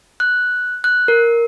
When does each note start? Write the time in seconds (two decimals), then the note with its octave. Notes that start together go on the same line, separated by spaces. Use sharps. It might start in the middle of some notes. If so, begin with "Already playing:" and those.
0.20 F#6
0.84 F#6
1.08 A#4